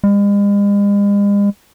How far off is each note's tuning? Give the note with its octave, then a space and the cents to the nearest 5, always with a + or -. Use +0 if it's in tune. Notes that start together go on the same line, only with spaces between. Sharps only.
G#3 -45